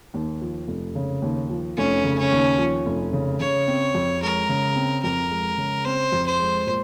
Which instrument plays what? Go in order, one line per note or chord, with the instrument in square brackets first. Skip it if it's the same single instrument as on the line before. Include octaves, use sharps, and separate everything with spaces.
[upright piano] D#2
F3
F1
C#3
D#2
F3
[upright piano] F1 [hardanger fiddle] C#4
[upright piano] C#3
[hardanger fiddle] C#4
[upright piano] D#2
F3
F1
C#3
[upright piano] C#3 [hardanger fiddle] C#5
[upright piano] C4
F2
[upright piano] G#3 [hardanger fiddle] A#4
[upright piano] C#3
C4
[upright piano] F2 [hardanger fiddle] A#4
[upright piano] G#3
C#3
[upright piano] C4 [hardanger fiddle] C5
[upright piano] F2
[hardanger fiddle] C5
[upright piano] G#3
A#2